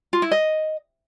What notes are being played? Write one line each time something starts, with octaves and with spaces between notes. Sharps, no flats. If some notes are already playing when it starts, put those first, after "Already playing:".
F4
E4
D#5